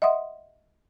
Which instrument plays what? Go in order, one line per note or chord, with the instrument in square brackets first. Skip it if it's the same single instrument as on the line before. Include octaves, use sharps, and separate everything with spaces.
[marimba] D#5 E5 F#5 C6 D#6